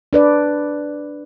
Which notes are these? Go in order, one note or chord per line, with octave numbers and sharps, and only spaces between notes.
D4 B4 D5